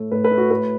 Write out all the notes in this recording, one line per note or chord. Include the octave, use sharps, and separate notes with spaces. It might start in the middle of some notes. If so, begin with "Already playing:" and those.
Already playing: A2 A3
A2 B4
B4
A3
F#4
A2 B4